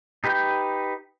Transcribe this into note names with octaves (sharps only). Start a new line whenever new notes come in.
D#4 G4 B4 G5 G6